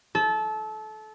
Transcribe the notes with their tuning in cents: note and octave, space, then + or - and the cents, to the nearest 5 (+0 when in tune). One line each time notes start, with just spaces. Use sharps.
A4 -25